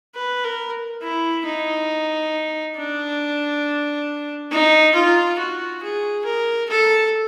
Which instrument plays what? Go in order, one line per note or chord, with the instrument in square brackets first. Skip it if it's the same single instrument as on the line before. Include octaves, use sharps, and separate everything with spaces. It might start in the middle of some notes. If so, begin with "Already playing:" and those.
[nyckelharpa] B4
A#4
E4
D#4
D4
D#4
F4
F#4
G#4
A#4
A4